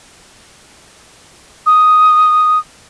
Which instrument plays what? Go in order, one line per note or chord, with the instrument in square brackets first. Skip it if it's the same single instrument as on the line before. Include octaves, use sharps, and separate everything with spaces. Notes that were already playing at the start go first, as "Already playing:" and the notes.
[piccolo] D#6